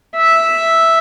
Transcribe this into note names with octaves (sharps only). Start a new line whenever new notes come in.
E5